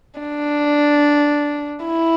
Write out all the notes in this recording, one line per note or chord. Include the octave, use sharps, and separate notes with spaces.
D4
E4